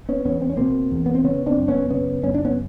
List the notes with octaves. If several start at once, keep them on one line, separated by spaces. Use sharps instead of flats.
B3 C#4
E2 B3 C#4
C4
C#4
B2 A#3 C4
E2
B3
C4
C#3 B3 C#4
C4 D4
F#2
B3 C#4
C#3 B3 C#4
F#2 C#4
D4
B3 C#4